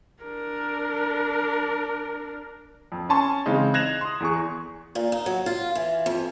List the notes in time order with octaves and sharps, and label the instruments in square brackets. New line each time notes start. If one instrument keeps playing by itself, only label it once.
[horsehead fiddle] D4 A#4
[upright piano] F2
C#4 G#5 A5 C6 C#6
C#3 E3 G#3 C4 D#4
F#6 G#6 A#6 E7 F7
C6 D#6
E2 G#4 C#6
[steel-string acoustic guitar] A#2
D#4
F#3
F4
E3
F2